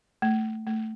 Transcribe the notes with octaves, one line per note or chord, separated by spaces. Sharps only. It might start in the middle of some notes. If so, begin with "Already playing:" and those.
A3
A3